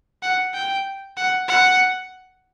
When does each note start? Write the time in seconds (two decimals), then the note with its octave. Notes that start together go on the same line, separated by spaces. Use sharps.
0.23 F#5
0.54 G5
1.17 F#5
1.48 F#5